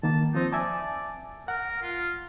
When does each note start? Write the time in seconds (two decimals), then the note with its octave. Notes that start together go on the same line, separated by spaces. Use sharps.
0.03 D#3 A#3 A5
0.35 F3 C4 D#4 C5
0.53 D5 E5 G#5 A5
1.48 A#4 F#5
1.82 F4